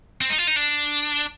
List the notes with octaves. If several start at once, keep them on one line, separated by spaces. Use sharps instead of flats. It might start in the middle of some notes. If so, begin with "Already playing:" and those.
C4
D#4
F4
D#4
D4